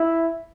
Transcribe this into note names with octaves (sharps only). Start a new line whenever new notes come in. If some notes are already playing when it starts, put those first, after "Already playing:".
Already playing: E4